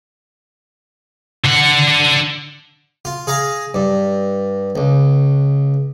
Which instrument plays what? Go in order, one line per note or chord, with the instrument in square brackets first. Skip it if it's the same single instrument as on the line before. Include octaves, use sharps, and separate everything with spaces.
[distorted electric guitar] D3 F#5
[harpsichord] F4
G#4 F5 A#5
G2
C#2